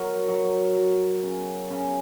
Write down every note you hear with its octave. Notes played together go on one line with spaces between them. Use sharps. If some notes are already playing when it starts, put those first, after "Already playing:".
Already playing: F#3 A#4
F#3
F#3
C#3
C#3